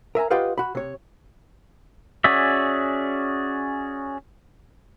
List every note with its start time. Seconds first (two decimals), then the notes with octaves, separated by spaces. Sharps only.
0.15 A#4 E5 G#5 A#5
0.30 F4 G4 B4 D#5 F5 F#5
0.58 F#4 B5
0.75 C3 C#5
2.24 C#4 F#4 G#4 D5 E5